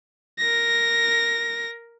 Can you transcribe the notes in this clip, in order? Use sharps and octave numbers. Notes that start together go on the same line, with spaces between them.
A#4 A#6